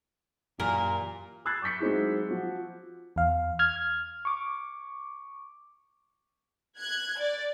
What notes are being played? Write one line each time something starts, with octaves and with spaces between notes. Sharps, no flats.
F#2 A#2 E3 A#3 G4 A#4 G#5
B5 E6 F#6 G#6 A6 C7
C#6 D6 G6 B6 C#7
F#3 G#3 C4 D#4 E4 G#4
F3 F#4
E2 F5
F6 G#6
C#6 D6
F#6 G#6
D5